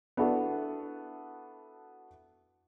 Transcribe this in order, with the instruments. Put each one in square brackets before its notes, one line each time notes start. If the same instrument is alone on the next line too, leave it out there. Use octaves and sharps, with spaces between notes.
[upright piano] B3 D4 E4 F#4 A4